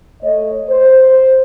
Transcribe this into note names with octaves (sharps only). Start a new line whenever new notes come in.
A3 C#5 D#5
C5